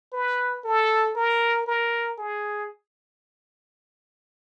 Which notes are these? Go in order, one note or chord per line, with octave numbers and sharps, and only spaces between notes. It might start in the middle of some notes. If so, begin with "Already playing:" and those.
B4
A4
A#4
A#4
G#4